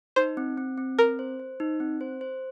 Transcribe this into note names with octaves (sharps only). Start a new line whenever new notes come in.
D#4 C5
C4
C4
C4
C4 A#4
C5
C5
D#4
C4
C5
C5